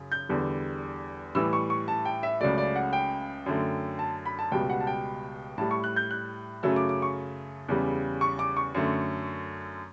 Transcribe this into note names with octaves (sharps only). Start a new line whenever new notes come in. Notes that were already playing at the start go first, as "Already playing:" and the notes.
Already playing: F#2 C#3
G6
E2 D3 G3
A2 E3 G3 E6
C#6
C#6
A5
G5
E5
C#2 C#3 F#3 A3 D5
D5
F#5
G5
F#2 D3 A3
A5
B5
A5
C#2 B2 G3 G5
F#5
A5
G5
A2 G3 A5
C#6
F#6
G6
F#6
F#2 C#3 F#3 A3 E6
D6
D6
C#6
E2 C#3 G3
C#6
D6
C#6
F#2 D3 A3